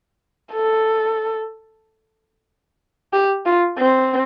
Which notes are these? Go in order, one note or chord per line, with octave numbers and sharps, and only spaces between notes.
A4
G4
F4
C4